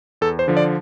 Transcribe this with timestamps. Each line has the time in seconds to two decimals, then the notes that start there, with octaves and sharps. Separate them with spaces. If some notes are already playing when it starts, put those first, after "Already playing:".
0.21 E2 A4
0.39 C5
0.48 D3 F3
0.57 D5